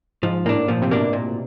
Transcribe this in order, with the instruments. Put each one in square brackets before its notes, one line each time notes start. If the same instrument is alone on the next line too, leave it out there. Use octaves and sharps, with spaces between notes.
[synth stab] G#2 [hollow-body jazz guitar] F3
[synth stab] A2 [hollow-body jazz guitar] A#3 D4
[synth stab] A#2 [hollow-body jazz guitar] F3
[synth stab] C3
[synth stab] B2 [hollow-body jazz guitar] A#3 D4
[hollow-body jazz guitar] A#2